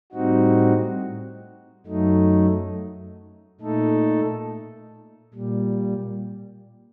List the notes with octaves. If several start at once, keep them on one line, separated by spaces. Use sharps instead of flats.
A2 G3 C4 D#4 F#4
F#2 F#3 A3 D#4
A#2 A3 D#4 A4
A#2 G3